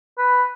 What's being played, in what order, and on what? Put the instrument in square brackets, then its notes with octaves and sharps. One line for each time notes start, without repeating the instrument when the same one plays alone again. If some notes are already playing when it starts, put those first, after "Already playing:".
[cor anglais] B4